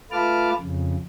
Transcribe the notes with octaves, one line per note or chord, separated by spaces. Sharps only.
A3 F4 B4 A5 D6 F6
F2 C#3